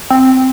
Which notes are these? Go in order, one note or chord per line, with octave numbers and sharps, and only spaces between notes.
C4